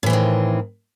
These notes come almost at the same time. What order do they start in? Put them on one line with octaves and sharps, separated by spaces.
A2 E3 C4 D#3